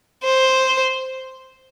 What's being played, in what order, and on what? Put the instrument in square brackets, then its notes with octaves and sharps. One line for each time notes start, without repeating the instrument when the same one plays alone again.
[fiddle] C5